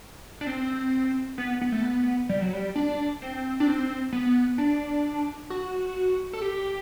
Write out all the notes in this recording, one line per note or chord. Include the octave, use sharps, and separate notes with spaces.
D4
C4
B3
B3
A3
B3
G3
F#3
G3
D4
C4
D4
C4
B3
D4
F#4
A4
G4